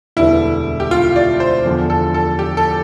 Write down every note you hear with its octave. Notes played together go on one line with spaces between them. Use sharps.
E1 D2 D3 G3 B3 E4
G4
F4
D5
C5
E2 D3 F3
A4
A4
G4
A4